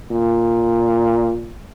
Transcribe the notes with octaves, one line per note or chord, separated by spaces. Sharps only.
A#2